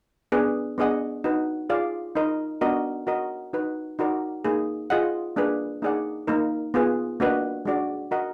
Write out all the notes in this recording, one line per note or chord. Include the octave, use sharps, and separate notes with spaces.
B3 D4 G#4 B4
B3 D4 G#4 D#5 F#5
D#4 F#4 B4
F4 G#4 D5 F5
D#4 A#4 D#5
B3 D4 F#4 A#4 D#5
F#4 A#4 D#5
D#4 F#4 B4
D#4 F#4 A#4 D5
A#3 D#4 G#4
F4 G#4 D#5 F#5
A#3 D4 G#4 B4
A#3 D#4 G#4 D5 F#5
A#3 D#4 A#4
B3 F4 G#4 B4
A#3 D4 F#4 B4 D#5
G#3 D4 F#4 D5
F#4 A#4 D#5 F#5